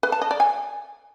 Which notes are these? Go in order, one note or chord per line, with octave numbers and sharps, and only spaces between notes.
B4
A5
D#5
D5
G#5